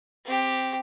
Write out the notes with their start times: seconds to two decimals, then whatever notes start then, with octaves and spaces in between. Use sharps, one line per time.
0.25 C4 G4